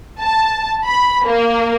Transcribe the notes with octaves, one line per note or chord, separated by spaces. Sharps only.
A5
B5
A#3